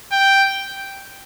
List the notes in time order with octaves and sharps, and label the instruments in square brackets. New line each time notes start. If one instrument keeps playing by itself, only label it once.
[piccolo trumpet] G5